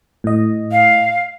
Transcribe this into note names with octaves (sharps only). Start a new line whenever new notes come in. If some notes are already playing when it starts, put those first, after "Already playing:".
A2 D#5
F5